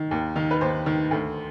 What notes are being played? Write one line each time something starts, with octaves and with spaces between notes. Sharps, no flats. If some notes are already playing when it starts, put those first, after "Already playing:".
Already playing: D#3
D#2
D#3
B4
D#2 C5
D#3
D2